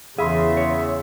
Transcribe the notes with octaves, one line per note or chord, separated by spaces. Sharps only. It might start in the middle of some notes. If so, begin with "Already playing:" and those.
E2 C#3 G#4 E5 F5 B5 C6
C#5